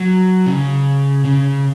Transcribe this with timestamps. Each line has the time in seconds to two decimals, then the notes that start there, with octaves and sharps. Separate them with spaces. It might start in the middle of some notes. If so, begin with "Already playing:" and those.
Already playing: F#3
0.46 C#3
1.25 C#3